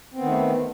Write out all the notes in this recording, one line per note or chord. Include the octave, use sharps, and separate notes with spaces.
D#3 A3 B3 C4